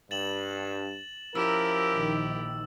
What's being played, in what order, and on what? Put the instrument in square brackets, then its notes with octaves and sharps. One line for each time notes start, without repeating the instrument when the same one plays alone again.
[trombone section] G2 [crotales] A6 E7 F#7
[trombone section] F3 C#4 A#4 [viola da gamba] E4 G4 [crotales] E6
[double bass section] A#1 D#3